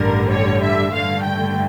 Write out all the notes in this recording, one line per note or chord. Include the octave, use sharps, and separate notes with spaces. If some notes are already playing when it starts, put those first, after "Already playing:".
Already playing: A1 G2 D3 G3 A#4
C#5
E5
G2 D3 A3 F5
G5